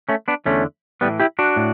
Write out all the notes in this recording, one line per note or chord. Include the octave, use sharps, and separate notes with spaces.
A3 C#4
B3 D4
E2 D3 A3 C#4
A2 E3 G3 B3
E4 G4
D4 F#4
A2